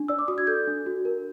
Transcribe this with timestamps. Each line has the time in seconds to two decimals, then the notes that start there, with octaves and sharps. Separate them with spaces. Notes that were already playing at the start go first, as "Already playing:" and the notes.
Already playing: D4
0.08 D5 E6
0.19 D6
0.28 F#4 D#6
0.38 G#6
0.47 A4 G6
0.67 D4
0.86 F#4
1.05 A#4